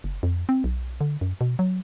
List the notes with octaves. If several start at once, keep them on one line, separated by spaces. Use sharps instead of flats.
F#1
F2
C4
B1
D3
F#2
B2
F#3